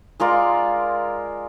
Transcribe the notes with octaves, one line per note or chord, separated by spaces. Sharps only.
G#3 F4 A#4 D5